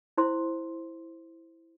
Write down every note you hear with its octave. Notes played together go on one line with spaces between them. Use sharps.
E4 C5 C6